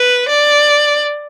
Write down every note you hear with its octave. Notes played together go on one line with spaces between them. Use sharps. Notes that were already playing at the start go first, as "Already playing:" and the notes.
Already playing: B4
D5